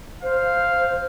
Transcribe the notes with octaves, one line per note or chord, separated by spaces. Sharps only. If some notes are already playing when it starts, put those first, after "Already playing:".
C5 F5